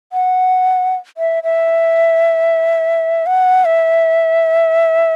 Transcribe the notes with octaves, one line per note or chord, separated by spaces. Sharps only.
F#5
E5
E5
F#5
E5